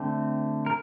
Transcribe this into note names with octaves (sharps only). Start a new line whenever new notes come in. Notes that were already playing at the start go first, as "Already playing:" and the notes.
Already playing: D3 A3 C4
A#4